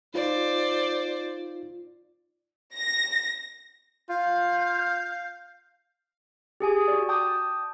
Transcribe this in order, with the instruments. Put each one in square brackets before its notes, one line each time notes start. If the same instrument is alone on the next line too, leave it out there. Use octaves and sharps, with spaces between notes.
[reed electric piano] D#4 F4 [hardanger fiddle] C5 D5
[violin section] A#6
[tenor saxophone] F4 [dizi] F5 [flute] G6
[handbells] G4 G#4 G#5 D#6
F#4 D5
G5 A5 D6 D#6 G6